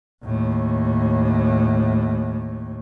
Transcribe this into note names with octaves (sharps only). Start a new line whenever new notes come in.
D#2 A2